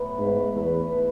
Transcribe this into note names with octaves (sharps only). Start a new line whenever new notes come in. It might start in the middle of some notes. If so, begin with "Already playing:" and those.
Already playing: A2 F#3 B3 F#4
G#2 A3 E4 B4
E2 A3 E4 B4
A3 E4 B4